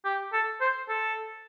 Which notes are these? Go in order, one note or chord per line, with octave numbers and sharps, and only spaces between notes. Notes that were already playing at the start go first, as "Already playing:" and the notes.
G4
A4
C5
A4